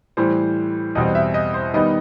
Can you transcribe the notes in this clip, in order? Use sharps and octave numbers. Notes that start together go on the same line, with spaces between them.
A2 E3 G3 C5
E2 B2 G3 C4 D#5
E5
D#5
C5
D#3 G3 B3 D#4 D#5